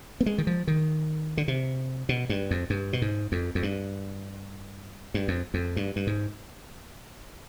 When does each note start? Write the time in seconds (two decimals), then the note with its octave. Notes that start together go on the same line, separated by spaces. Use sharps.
0.21 B3
0.26 G#3
0.38 D#3
0.47 F3
0.68 D#3
1.37 D3
1.48 C3
2.09 B2
2.29 G2
2.51 F2
2.70 G2
2.93 B2
3.02 G#2
3.32 F2
3.55 F2
3.63 G2
5.14 G2
5.28 F2
5.54 F2
5.77 G2
5.96 G2
6.07 G#2